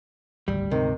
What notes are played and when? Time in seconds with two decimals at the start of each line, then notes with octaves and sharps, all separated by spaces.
0.48 G#1 D2 G3
0.71 D2 G#2 C3 D#3 G#3